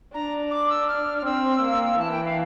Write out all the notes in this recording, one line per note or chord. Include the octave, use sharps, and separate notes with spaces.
D4 A#5
D6
E6
F6
F6
C4 E6
A#3
E3 A5
G5
F5